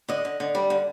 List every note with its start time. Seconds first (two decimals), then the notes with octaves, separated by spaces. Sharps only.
0.09 D3 D#5
0.25 D3
0.40 D3
0.55 G3
0.70 D3